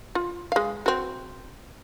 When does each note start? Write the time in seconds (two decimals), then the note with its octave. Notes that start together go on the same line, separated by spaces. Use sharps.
0.15 F4
0.52 G#3 F5
0.86 C4 F#4